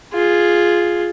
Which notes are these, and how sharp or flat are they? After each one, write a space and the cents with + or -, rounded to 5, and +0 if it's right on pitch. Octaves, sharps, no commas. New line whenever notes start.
F4 +0 G#4 +0